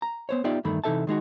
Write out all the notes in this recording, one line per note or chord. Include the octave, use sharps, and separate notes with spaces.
A#5
B3 C5 C#5
B3 D#4 F4 G4 D5 E5
E2 G2 D#3 A3 B5
C3 E3 D#4 A4 E5 A5
D#3 G#3 D#4 F#4